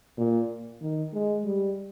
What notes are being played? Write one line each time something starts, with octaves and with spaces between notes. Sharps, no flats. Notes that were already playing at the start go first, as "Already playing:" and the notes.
A#2
D#3
G#3
G3